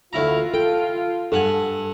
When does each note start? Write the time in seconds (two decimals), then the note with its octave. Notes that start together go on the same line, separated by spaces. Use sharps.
0.13 D2 E4 F4 A#5
0.54 A4 G5
1.32 G2 A4 F#5 G#5